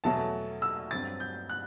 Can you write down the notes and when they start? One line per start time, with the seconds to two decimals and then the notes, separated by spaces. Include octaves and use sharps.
0.04 E2 B2 F#3 A3 A5
0.62 E6
0.91 G2 F#3 C4 A6
1.20 G6
1.49 F#6